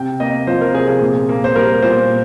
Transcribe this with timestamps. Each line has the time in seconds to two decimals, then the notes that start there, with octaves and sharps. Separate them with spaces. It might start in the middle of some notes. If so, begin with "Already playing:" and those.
Already playing: C3 G5
0.20 A#3 D#5
0.47 F3 C5
0.61 A#4
0.74 C3 G#4
0.88 G#4
1.01 A#2
1.29 A#3
1.44 C5
1.56 G3 A#4
1.82 A#2 C5